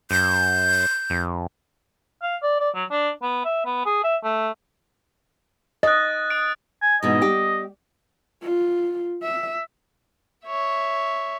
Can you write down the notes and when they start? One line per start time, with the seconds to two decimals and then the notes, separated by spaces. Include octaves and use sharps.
0.11 F#2 G6
1.10 F2
2.22 F5
2.43 D5
2.60 D5
2.75 F#3
2.91 D4
3.22 B3
3.45 E5
3.66 B3
3.86 G#4
4.04 E5
4.23 A3
5.83 D#5 F#6 A6
6.30 D#6 D7
6.82 G#5
7.02 G#2 B2 E3 D#5
7.21 G3 G4
8.42 F4
9.23 E5
10.45 C#5 E5